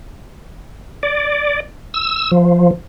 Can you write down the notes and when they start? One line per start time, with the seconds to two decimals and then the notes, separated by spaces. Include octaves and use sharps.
1.03 D5
1.94 E6
2.32 F3